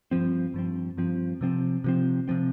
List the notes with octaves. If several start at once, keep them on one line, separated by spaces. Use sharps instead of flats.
G2 F3 C4
G2 F3 C4
G2 F3 C4
C3 F3 C4
C3 F3 C4
C3 F3 C4